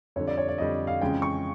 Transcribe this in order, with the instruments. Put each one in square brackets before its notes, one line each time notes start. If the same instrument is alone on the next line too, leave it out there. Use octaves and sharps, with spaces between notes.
[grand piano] F2 D3 G3 [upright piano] C#5
[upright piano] D5
C#5
D5
[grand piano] F2 D3 G3 [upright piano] D#5
[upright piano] F5
[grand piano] F2 C#3 E3 G#3 C#4 [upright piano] G5
[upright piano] C#6